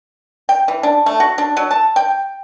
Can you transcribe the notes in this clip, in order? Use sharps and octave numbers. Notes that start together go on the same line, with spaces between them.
G5
E3
D4
A3
F#4
D4
F#3
A5
G5